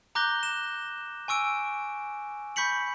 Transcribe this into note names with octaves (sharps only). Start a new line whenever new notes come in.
A#5 D6 F#6 G6 A#6 G7
E7
G#5 C#6 E6 D7
B5 C#6 G6 B6 C#7 F#7